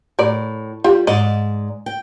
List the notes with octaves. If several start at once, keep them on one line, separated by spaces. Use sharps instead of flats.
A2 A#4 D5
G3 F4 G4
G#2 D5 D#5
G5